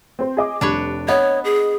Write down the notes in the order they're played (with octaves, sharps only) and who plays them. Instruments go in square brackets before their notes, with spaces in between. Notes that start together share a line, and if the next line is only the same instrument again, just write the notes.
[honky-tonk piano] C4 C5
G#4 D#5 D6
[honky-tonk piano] F1 G3 [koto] D4 B4 C#5
[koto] B3 [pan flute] C#5 [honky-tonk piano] D#5
[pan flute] G#4